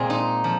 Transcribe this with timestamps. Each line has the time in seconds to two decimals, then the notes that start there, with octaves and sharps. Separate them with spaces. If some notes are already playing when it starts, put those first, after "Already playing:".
Already playing: A#2 G#3 C4 F4 G#4
0.10 D#4
0.44 F3